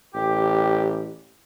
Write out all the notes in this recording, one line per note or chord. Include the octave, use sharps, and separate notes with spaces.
A1 G4